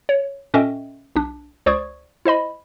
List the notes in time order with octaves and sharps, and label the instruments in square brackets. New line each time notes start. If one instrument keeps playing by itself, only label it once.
[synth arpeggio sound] C#5
A#2 C#4 A4 D#5 E5 G5
B1 D4
C#2 C5 D5 C#6 D#6 G#6
E4 C5 D#5 B5